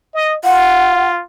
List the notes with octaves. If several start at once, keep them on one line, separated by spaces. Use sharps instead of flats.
D#5
F4 F#5